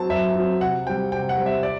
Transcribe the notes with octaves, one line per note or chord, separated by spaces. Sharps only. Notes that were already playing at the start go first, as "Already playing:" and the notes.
Already playing: F#3 C4 A5
F#2 E5
F#3 C4
C3 F#5
G3 C4 G5
C3 G5
F#5
G3 C4
E5
D5